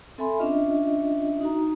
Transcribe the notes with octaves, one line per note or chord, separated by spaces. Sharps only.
C4 A4 E5 G#5 B5 C6
C#4 D4 F4 D#5 E5
D#4 F#4 A#5